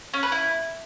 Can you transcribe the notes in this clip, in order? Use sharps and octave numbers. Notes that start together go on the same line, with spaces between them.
C#4
B4
E4